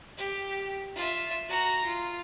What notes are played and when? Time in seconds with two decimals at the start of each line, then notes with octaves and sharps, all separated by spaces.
0.18 G4
0.96 F4 E5
1.49 F#4 A#5
1.85 F4